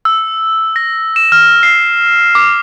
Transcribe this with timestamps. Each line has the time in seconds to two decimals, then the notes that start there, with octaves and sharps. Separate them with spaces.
0.05 E6
0.76 A#6
1.16 E7
1.32 F6
1.63 C7
2.35 D6